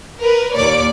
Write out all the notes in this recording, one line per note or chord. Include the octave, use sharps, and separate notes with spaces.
A#4 B4
D#2 A#2 C#5 D5 D6